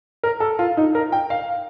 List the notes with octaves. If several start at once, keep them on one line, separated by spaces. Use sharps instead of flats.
A#4
A4
F4
D#4
A#4
G5
F5